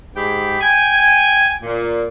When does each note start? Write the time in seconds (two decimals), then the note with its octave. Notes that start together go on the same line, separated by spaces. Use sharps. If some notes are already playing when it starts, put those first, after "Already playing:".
0.16 G#2 G4 G#4 G5 B5
0.61 G5 G#5
1.63 A#2